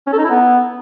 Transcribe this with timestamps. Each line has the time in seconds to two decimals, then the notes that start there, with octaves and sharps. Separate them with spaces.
0.07 C#4
0.13 A4
0.18 D#4
0.24 E4
0.30 B3